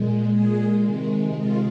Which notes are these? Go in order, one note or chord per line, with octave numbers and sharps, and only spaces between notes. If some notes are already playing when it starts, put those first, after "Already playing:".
Already playing: A#2 G#3
A#2 G#3 G#4
C3 D#3 G#3
C3 D#3 G#3 F4